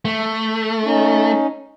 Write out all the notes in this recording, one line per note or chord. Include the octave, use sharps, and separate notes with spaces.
A3
C#4 D#4